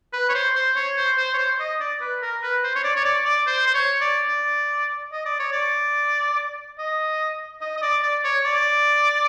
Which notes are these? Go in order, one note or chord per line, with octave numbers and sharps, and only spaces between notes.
B4
C#5
C5
C5
C#5
C5
C5
C#5
C5
D#5
D5
B4
A#4
B4
C5
C#5
D5
C#5
D5
D5
C5
C5
C#5
D5
D5
D#5
D5
C#5
D5
D#5
D#5
D#5
D5
D5
C#5
D5